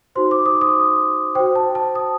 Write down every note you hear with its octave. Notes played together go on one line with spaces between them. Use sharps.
D#4 F#4 C5 C6
D6
D#6
D#6
F#4 C5 G5
A5
A5
D#6